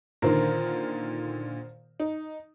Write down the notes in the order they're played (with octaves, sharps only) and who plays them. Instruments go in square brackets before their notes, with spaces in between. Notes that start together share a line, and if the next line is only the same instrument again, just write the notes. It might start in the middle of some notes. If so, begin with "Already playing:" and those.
[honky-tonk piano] A#2 D3 D#3 [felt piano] A#4 C5
[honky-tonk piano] D#4